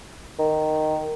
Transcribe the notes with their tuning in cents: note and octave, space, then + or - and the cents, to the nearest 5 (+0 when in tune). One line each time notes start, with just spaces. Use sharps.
D#3 -5